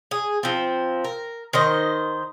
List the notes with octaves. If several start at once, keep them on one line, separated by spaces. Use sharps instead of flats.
G#4
F3 C4
A#4
D#3 C5 D#5